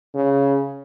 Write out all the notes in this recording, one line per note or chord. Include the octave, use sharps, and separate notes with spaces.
C#3